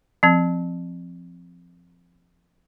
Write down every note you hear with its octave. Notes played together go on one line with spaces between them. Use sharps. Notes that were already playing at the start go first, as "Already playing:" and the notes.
F3 C4